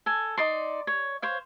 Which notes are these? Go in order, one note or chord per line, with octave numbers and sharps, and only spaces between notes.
A4 G#5
D#4 D5 C6
C#5
C5 C#5 F5